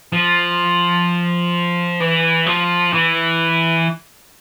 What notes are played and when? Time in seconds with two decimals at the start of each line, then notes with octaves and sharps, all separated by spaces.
0.12 F3
2.00 E3
2.46 F3
2.93 E3